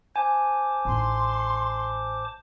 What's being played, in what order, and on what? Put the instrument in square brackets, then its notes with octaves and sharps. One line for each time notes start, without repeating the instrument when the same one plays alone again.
[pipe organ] C5 A5 D6 [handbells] G#5
[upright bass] A1 D#4 [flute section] C6